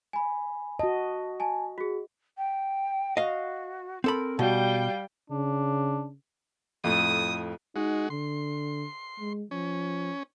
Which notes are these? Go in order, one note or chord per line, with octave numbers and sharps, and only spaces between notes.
G#5 B5
F#4 D#5 A5
G#5 A5
F#4 G#4
G5
F#4 D#5 F5
C4 A4 A#4 B5
B2 G3 F5 G5
C#3 D4
F2 A2 D#6
G#3 D#4 F#4
D3 C6
G#3
F3 C#4